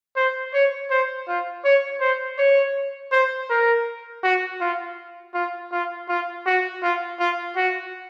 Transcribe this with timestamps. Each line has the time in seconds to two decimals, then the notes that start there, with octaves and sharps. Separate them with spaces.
0.16 C5
0.54 C#5
0.91 C5
1.28 F4
1.64 C#5
2.01 C5
2.38 C#5
3.12 C5
3.50 A#4
4.24 F#4
4.61 F4
5.34 F4
5.72 F4
6.09 F4
6.46 F#4
6.83 F4
7.19 F4
7.57 F#4